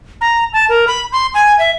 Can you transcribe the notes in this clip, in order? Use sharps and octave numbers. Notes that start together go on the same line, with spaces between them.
A#5
A5
A#4
B5
C6
G#5
E5